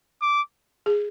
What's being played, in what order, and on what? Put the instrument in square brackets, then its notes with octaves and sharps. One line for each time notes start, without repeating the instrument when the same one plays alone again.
[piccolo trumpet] D6
[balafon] G#4